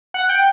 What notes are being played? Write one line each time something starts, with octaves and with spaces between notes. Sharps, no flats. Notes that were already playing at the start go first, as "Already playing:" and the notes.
F#5
G5